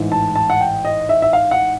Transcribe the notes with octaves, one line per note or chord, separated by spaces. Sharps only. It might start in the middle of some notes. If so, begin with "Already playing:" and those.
Already playing: A1 G#2 E3
A5
A5
F#5
G5
D#5
E5
E5
F5
F#5